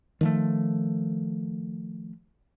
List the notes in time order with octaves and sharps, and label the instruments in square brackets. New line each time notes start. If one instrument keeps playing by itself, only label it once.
[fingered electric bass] D#3 F3 A3